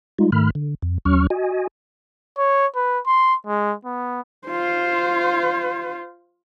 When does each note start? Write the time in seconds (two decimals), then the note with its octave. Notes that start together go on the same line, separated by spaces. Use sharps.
0.19 G3 G#3 D#4 F4
0.32 G#2 D#3 A3 B5 F6
0.55 D3
0.82 F2
1.05 D#2 F#3 C#4 C#6 F6
1.30 F#4 D#5 G#5
2.38 C#5
2.76 B4
3.06 C6
3.47 G#3
3.85 B3
4.48 F4 C5